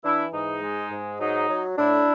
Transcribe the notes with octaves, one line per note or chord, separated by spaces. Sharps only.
E3 D4 E4
G#2 D#4
G#3
G#2
F#3 D#4
F#3
A2 D4 E4